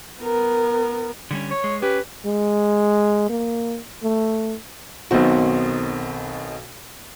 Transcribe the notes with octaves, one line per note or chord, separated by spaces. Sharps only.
B3 A#4
D3 G3 C#4
C#5
G#3
C#4 G4 B4
G#3
A#3
A3
B1 B2 D#3 C4 F#4